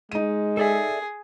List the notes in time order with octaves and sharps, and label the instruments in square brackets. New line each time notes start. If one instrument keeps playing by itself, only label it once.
[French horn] G#3 [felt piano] D#4 D#7
[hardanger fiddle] G#4 [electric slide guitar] A4 D5 E5